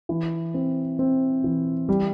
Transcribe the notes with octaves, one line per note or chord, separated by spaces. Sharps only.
E3
C4
C4
E3
G3